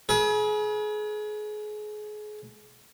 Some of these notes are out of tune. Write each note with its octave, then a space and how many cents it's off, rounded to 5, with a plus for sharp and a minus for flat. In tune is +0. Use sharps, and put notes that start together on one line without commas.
G#4 +30 B4 -40